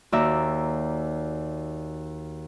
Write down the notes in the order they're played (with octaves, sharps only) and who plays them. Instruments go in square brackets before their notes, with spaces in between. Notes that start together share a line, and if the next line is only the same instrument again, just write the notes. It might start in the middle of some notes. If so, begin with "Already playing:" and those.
[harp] D#2 F#4 D5 E5 A#5